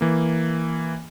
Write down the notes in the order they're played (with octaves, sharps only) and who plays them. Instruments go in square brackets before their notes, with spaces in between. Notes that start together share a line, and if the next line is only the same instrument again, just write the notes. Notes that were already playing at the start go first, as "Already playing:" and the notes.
[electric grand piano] E3 A#3